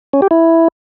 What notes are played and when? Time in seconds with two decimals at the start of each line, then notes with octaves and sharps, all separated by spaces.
0.13 C#4
0.22 G4
0.31 E4